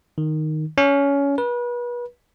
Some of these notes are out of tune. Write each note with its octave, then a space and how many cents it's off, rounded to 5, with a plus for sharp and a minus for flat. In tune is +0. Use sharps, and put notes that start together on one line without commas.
D#3 -5
C#4 +20
B4 -35